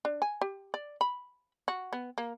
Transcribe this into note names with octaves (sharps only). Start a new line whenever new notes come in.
D4
G#5
G4
D5
B5
F#4
B3
A#3